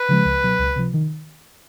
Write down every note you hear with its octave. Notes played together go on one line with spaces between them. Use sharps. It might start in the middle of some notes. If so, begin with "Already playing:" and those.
Already playing: B4
C#3 F3 G#3
C#2
B2 F#3
C#2
C3 F3
D#3